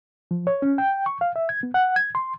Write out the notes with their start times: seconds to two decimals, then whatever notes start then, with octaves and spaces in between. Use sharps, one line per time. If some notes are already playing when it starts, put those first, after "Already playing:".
0.31 F3
0.47 C#5
0.62 C#4
0.78 G5
1.06 C#6
1.21 F5
1.36 E5
1.49 G#6
1.63 B3
1.74 F#5
1.96 G#6
2.15 C6